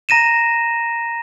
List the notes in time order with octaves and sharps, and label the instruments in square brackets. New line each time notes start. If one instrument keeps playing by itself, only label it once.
[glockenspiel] A#5 A#6 D#7 E7